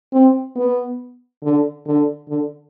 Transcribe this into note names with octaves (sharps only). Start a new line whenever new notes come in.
C4
B3
D3
D3
D3